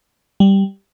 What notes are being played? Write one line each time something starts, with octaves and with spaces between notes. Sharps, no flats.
G3